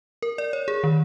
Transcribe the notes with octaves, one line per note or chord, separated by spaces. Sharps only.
A#4
D5
C#5
G#4
D#3